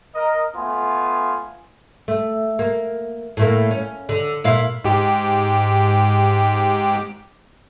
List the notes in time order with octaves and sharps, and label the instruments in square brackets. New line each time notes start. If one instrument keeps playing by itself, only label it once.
[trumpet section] A#4 D#5
A3 B3 F4 G#5
[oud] A3
A#3
A2 A3 A#3
C#4
D3
A#2 E4 F5
[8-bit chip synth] G#2 G4